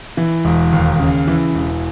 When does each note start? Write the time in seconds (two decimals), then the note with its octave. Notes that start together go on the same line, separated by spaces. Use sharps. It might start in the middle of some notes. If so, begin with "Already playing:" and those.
0.17 E3
0.45 E1
0.72 D#2
0.99 C#3
1.27 E3
1.55 E1